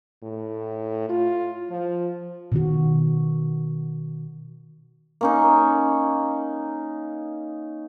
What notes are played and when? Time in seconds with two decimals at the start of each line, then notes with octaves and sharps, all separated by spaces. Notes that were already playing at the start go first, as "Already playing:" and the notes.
0.23 A2
1.09 F4
1.71 F3
2.52 B2 D#3 F#4
5.21 A#3 C#4 D#4